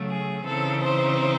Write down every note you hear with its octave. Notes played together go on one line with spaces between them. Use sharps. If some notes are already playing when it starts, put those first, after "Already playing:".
Already playing: C#3 F#3 A3
G#4
C#3 E3 C4 D#4 A4
C4 C5